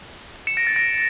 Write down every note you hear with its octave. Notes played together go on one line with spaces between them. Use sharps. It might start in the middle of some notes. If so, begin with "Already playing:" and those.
C#7 E7
A#6 D7
A6 C#7
A#6 D7